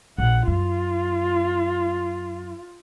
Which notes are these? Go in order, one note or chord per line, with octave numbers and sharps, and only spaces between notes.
A#1 F#5
F#2 F4